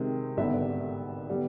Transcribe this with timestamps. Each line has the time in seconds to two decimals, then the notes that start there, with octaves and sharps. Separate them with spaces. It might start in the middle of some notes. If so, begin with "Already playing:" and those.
Already playing: C3 D#3 G#3 C4
0.37 G#1 G2 D3 G3 B3 E5
1.30 D3 G3 B3